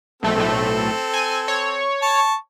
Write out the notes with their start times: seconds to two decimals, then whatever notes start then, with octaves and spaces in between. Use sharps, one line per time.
0.23 B1 A3 C4 A4
0.36 B1 A2 A3
1.14 G#5
1.48 C#5
2.02 A5 C#6